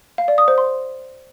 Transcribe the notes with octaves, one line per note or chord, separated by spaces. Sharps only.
F5
D5
D#6
C5
C6